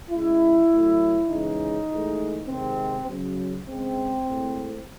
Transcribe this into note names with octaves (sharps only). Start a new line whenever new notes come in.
C#3 G#3 E4
A2 F#3
C#3 E3 G#3 D#4
A2 E3 G#3
C3 D#3 G#3 C4
C#3 F#3
C#3 G#3 C4
A2 G#3